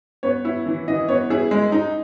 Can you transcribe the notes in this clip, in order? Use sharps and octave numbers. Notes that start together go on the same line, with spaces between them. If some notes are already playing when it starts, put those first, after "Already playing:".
B3 C#5
E4
E3
E3 D#5
B3 C#5
E4 G#4
G#3
D#4